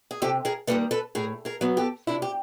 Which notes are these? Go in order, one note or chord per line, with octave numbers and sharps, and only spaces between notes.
G#4
C3 G4 A4
G#4 A#4
D#3 G3 A#3 A4 B4
A4 B4
A2 G#4 A#4
G#4 A#4
F#3 B3
G4 A4
C3 D4 E4
G4